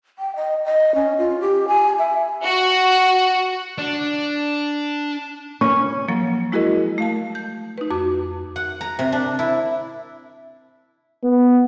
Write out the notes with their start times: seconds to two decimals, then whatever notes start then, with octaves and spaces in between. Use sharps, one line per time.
0.19 G5
0.36 D#5
0.65 D#5
0.95 C#4
1.18 F4
1.40 G4
1.68 G#5
1.99 E5
2.44 F#4
3.78 D4
5.61 C#4 C#6
6.08 F3 F#3 A#3
6.52 G#3 E4 F#4 G#4 A#4 D#5
6.98 A3 F5 A5
7.35 G6
7.78 D#4 B4
7.91 F2 F#4 D6
8.56 F#5
8.81 A#5
8.99 C3
9.12 D4
9.39 E4
11.24 B3